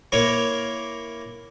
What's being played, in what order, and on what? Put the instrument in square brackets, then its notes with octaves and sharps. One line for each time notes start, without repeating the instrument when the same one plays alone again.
[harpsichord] A#3 E4 A#4 C#5 F5